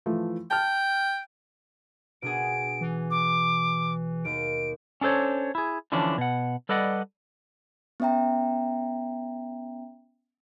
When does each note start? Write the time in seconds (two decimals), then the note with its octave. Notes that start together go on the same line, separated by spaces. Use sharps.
0.06 E3 F3 A3
0.51 G5 A5 F6
2.22 B2 D4 G#4 D7
2.81 E3
3.11 D6
4.25 D#2 D7
5.01 C#4 D4 A4 C5 C#5
5.55 E4 G#4
5.92 D3 E3 F3 C#4 D4
6.18 B2 F#5
6.69 G3 A4 B4 D5 D#5 F#5
8.00 B3 C#4 E5 G5 A#5